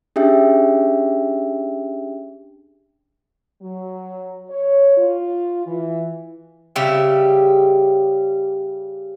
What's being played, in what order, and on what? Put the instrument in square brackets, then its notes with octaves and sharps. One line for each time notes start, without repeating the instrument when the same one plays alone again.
[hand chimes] C#4 D4 G4 G#4 E5 G5
[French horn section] F#3
C#5
F4
E3
[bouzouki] C#3 G3 G4 E5